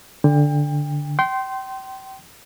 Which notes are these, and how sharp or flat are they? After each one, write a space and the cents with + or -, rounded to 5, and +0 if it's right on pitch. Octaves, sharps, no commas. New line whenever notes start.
D3 +0 G5 +30
G5 -30 C6 +0